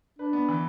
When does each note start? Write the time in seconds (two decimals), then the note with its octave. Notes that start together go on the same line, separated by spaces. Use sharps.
0.19 D4 B4
0.33 B3
0.49 E3